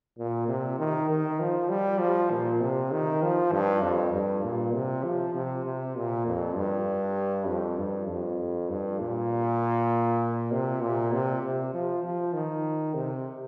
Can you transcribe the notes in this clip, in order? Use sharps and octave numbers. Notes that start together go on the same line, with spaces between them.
A#2
C3
D#3
D#3
F3
G3
F3
A#2
C3
D#3
F3
G2
F2
G2
A#2
C3
F3
C3
C3
A#2
F2
G2
F2
G2
F2
G2
A#2
C3
A#2
C3
C3
F3
F3
D#3
C3